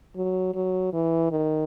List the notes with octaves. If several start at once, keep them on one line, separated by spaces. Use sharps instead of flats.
F#3
F#3
E3
D#3